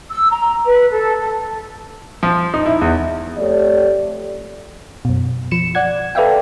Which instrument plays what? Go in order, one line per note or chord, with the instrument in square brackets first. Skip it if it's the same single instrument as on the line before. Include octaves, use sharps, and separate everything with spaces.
[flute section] E6
A#5
B4
A4
A4
[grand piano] F3
D#4
E4
E2
[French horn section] F2 A3 G4 C#5 D5
[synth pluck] F#2 B2
F3 C#7 E7
D5 F#5 G#6
A4 B4 D5 E5 F5 G5